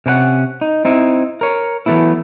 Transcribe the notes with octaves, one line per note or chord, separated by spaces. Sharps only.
C3 C#4 A#4 F#5
D#4
C4 D#4 E4
A#4 C#5
E3 F#3 G3 A3 B3 E4